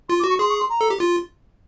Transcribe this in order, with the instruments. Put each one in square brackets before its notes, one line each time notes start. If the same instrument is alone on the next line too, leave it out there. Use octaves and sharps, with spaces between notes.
[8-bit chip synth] F4 [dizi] C6
[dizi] D6
[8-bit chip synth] F#4
[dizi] C#6
[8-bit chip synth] G#4 [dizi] C6
[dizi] C#6
C6
A#5
[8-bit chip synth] A4
G4
F4